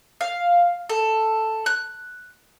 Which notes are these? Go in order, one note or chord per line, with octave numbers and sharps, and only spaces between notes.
F5
A4
F#6